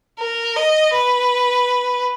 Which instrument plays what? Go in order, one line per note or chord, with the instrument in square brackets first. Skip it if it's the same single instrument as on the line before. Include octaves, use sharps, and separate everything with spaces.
[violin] A#4
D#5
B4